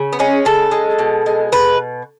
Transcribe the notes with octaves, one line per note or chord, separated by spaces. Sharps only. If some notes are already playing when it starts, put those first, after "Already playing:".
Already playing: C#3
B3
G#3 C#4
C#3 A4
G#3
B2
G#3
B2 B4